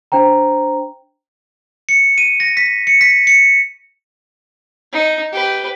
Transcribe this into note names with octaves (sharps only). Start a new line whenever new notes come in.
D4 C5 G5 A#5
C#7
D#7
A#6
B6
C#7
B6
C#7
D#4
G4 B4